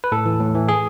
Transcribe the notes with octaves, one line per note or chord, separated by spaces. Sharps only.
B4
A2 A4
E3
A2
E3
G#4